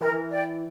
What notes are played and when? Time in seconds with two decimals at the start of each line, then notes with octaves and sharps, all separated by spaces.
0.01 E3 A#4
0.30 D5 G5